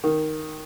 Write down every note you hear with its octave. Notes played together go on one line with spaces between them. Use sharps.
D#3